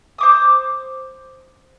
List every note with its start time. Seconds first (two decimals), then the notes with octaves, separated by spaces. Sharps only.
0.18 C5 D6 D#6